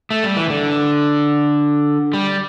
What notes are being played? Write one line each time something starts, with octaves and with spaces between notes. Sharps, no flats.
A3
G3
E3
D3
G3